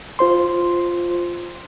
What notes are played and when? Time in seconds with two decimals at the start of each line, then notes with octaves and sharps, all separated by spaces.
0.19 F4 C5 C6